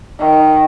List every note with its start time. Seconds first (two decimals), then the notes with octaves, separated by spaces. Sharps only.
0.20 D#3